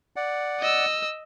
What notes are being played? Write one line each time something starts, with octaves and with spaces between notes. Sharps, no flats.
D5 F#5
D#5 E6